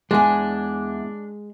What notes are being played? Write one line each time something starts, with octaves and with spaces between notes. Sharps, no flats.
E2 G#3 D4 G#5